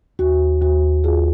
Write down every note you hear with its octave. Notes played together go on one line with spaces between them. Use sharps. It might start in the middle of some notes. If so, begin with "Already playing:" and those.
D#2 F#4
D#2 F#4
D#2 F4 G#4